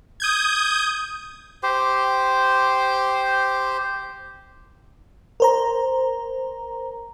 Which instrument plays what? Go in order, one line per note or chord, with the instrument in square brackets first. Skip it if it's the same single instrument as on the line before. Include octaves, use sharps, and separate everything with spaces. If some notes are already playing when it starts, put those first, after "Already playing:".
[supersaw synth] D#6 G6 G#6
[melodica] G4 C5
[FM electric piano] A#4 C5 A#5